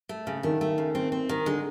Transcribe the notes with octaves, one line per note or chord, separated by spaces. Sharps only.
A3
C#3
D#3 A3
A3
C#3
C4
C4
D#3
D3 G#3